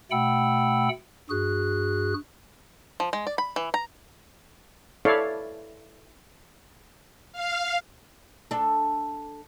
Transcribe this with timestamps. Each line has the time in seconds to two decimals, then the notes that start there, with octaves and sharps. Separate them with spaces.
0.11 B2 A3 F#5 G5 B5 E6
1.30 G2 F#4 G#4 F#6
3.00 F3
3.13 G#3
3.27 D5
3.38 B5
3.56 E3
3.74 A#5
5.05 E4 A4 C#5 D5 F5
7.32 F5
8.51 D4 A4